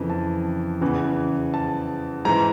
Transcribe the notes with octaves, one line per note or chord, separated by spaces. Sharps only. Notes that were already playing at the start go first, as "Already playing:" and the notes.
Already playing: F2 C#3 E3
A5
E2 C#3 E3
A5
G#2 E3 A#5